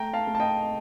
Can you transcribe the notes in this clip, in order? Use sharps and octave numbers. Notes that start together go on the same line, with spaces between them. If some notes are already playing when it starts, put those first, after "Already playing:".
Already playing: A3 G5 A#5
F5 A5
A3
A5
D#5 G5